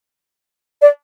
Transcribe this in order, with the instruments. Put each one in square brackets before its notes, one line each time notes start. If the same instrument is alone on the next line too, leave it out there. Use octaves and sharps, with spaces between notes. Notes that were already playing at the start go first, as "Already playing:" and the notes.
[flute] D5